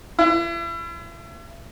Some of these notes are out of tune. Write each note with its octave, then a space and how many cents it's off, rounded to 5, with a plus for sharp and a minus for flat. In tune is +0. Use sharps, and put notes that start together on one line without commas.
E4 +40